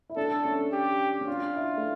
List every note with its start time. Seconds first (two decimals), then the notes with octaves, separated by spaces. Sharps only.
0.09 E4
0.16 D4 A4
0.45 C#4
0.72 G4
1.21 C#4
1.28 D4 F4
1.55 E4
1.77 A3